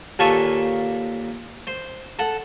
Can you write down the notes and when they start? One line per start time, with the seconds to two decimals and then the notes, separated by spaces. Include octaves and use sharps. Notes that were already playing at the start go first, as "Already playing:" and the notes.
0.19 D#2 A#2 A4 G#5 A5 C#6
1.67 C5
2.19 A4 F#5